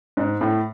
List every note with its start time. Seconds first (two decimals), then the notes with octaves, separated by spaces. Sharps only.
0.17 G#2
0.41 A2